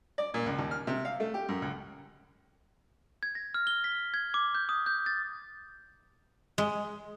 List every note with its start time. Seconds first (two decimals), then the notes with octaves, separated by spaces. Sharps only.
0.18 D5
0.34 A#2
0.46 C#2
0.58 D#2
0.71 F6
0.87 C3
1.05 F5
1.20 A3
1.34 G4
1.49 F#2
1.62 C#2
3.23 G#6
3.35 A#6
3.54 F6
3.67 G7
3.84 B6
4.14 G#6
4.34 D6
4.55 G6
4.69 D#6
4.86 G6
5.06 A6
6.58 G#3